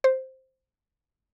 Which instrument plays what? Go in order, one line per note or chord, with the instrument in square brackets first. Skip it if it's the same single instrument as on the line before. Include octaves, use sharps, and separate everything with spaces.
[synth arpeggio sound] C5